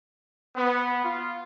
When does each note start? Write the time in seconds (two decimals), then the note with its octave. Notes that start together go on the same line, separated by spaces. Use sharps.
0.54 B3
1.03 F4